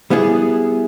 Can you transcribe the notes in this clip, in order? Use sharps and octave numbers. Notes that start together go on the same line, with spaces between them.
G3 B3 E4 G#4